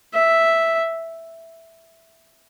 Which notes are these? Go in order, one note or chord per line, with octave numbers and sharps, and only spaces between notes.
E5